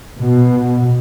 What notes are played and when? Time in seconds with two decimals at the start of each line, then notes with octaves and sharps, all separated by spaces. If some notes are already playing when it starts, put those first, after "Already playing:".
0.16 B2